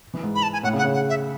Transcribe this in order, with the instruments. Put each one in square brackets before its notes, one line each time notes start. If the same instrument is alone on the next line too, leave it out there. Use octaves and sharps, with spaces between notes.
[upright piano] E3
G#2
[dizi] B5
A5
G#5
[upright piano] A2 [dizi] F#5
[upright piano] C#3
[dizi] F#5
[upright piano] C#3
[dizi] F#5
E5